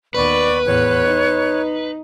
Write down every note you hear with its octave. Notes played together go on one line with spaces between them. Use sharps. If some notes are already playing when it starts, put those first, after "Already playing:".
D#2 B3 B4 D5 C#6
E2 A2 C#5 F#6
D#4